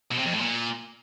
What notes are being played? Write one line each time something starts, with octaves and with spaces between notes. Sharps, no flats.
B2
C3
F2
A2
A#2